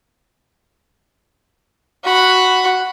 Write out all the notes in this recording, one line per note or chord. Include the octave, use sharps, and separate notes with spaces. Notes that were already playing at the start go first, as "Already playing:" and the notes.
F#4 B5